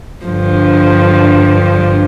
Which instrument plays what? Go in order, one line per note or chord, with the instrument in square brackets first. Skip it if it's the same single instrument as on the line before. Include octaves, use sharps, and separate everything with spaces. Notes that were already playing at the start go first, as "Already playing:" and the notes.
[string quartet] G2 D3 F3